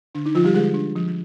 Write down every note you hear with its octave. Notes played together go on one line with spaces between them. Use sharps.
D3 D4
D#4
D3 F3 F4
G3 G4
D3 G#3 G#4
D4
F3